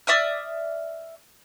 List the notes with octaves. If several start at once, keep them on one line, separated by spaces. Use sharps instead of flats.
D5 E5 D#6 F6